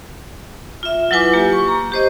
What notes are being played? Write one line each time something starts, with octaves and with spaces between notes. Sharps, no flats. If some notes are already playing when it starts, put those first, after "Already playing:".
F4 E5
F#3 E4 F4 B4 G#5 D6
A#3 G4
C#6
A#5
G4 C5 D#5